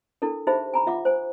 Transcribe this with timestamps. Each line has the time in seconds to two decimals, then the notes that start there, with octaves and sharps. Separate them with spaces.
0.22 D4 E4 A4 A#4
0.47 D#4 G4 G#4 C5 E5 B5
0.74 G#5 A#5 B5
0.87 F4 E5 F#5 D6
1.05 C5 G#5